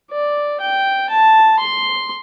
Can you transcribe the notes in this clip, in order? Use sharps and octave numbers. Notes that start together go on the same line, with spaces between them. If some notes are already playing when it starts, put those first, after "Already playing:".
D5
G5
A5
C6